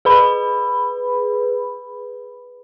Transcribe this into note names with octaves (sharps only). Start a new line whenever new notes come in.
G#4 B4 B5